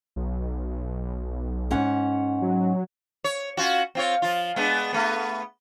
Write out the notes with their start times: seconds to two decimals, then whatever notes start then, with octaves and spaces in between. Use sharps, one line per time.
0.16 B1
1.71 G#2 C#4 F#5
2.42 F#3
3.24 C#5
3.57 C#4 F4 F#4
3.95 C4 F4 C#5
4.22 F3 F4
4.56 G#3 B3 D4
4.93 A3 B3